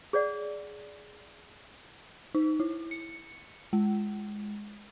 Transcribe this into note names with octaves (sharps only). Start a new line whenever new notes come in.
G#4 C#5 D5 F#5
D#4
E4
C#7
G#3